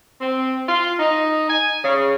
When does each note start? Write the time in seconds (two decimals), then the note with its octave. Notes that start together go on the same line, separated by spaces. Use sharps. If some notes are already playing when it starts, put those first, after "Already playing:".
0.21 C4
0.68 F4
0.99 D#4
1.48 G#5
1.83 C#3